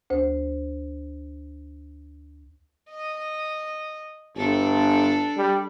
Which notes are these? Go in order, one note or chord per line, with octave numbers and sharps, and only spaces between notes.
D2 C5
D#5
G1 D4 A4
G3